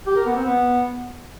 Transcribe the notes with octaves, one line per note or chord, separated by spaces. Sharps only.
G4
A#4
B3
C4
B3